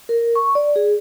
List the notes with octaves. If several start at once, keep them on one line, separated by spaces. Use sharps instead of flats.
A#4
C#6
D5
G#4